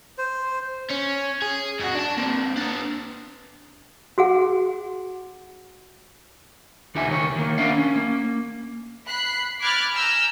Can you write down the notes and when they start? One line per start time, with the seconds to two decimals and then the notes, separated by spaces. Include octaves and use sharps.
0.18 C5
0.91 C#4
1.42 G#4
1.79 F2 F#4
1.95 D4 A5
2.17 A#3 C4
2.56 B3 D4
4.18 F#4 G#4 F#5
6.95 D2 D#4 G4 E5 G#5
7.08 C#2 D#3 C#5
7.36 D#3 A#3
7.58 B3 C#4 D4 D5 E5 F5
7.78 C#4
7.96 A#3
9.08 B5 F#6 C7
9.61 B5 D6 F6 F#6 G#6 A6
9.94 G#5 A#5 E6 F6 G6